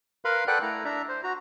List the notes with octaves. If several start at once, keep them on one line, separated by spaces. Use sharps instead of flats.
A#4 B4 F5 B5 C6
A4 B4 D5 F#5 G5 F#6
A3 E4 A#5
D4 E5 A#5
C5
F#4 A#5